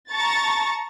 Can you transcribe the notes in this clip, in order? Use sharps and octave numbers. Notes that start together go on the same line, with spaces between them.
A5 A#5 C#6 A6